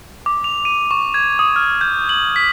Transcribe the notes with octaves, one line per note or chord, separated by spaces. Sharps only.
D6
F7
D#7
C#6
G#6
D#6
F6
G6
F#7
B6